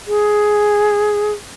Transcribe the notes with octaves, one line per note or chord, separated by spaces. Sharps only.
G#4